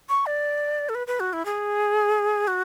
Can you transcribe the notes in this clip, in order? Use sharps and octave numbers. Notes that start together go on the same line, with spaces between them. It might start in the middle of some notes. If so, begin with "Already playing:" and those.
C#6
D5
A4
B4
B4
F#4
E4
G#4
F#4